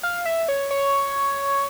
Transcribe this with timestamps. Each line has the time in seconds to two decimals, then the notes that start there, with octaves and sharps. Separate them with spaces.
0.03 F5
0.25 E5
0.48 C#5
0.71 C#5